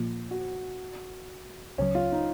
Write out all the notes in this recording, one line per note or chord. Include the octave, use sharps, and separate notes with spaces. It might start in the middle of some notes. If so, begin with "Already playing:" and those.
Already playing: A#2 F3 A#3 F4
F#4
C#2 C#3 F#3 C#4
F4
D#4